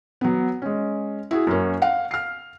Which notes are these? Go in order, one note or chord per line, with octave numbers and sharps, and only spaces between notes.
F#3 B3
G#3 C#4
E4 F#4 G#4
F#2 A#3 C#4
F5 F#5
F6 C7